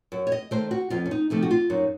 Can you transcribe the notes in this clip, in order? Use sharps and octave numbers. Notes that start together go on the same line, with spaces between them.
F#2
C#5
D#5
D#3 A3 C5
F#4
F2 F4
C#4
D#4
C3 F3 A3 D#4
F#4
F4
F#2 D#4